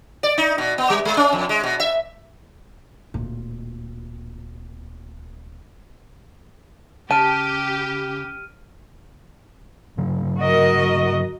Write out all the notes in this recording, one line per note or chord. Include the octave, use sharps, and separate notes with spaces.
D5
D#4
B2
B3
G3
G#3
C#4
F2
G#3
B2
E5
D1 A#2
C#3 G4 A5 F6 D7 D#7
G2 C#3 F#3
F#4 A#4 D#5